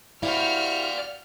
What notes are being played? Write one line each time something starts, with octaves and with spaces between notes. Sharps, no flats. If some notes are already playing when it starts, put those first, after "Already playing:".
E4 F#4 G4 C5 D5 F5 G5 F6